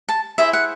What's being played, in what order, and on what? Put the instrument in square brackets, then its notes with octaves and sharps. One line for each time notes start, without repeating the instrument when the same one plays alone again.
[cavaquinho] A5
E4 G#4 C5 E5
F#5